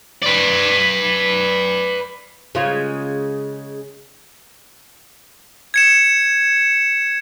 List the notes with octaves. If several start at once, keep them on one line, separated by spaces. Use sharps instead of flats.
B4 D5
C#3 G#3 F4
G#6 C#7 E7